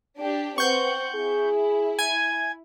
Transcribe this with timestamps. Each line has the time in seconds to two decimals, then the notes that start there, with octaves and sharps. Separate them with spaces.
0.18 D4 G4
0.58 C4 B4 F#5 C#6 G6
1.15 E4 G#4
1.99 G#5 G#6